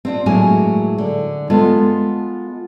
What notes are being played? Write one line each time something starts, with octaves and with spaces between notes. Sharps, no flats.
C4 D4 F4
A2 F#3 G#3 A#3 G#5
D3
G#3 B3 F4 A4